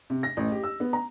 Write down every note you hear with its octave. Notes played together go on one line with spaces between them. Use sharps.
C3
A#6
A1
G4
E6
B3
A#5